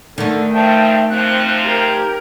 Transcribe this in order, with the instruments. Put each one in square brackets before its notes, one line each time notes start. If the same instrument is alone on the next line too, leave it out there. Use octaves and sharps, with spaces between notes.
[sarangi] D3 [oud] D#3 A3 [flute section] A4
[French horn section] G2 F3 [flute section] E5 A5 [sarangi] G5
[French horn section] C3 F3 [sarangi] C4 [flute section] G5 F#6
[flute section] G4 G#6 [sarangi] A#4